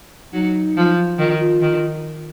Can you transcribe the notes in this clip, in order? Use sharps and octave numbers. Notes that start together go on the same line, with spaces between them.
F#3 D#4
F3
D#3 F4
F4
D#3